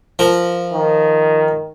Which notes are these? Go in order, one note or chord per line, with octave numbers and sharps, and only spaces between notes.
F3 A#4
D#3